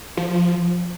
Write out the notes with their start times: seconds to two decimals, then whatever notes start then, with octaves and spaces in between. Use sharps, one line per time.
0.17 F3